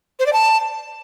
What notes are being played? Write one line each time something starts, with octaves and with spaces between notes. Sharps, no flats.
C5
D5
A5